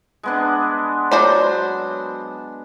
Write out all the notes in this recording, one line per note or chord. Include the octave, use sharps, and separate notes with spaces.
G#3 B3 D4
F#3 C5 D5